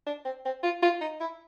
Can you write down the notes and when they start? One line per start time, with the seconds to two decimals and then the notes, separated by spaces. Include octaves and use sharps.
0.07 D4
0.25 C4
0.45 C4
0.63 F4
0.82 F4
1.01 D#4
1.20 E4